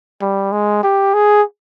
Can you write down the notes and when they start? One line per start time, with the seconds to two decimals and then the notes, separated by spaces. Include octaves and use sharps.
0.22 G3
0.52 G#3
0.83 G4
1.14 G#4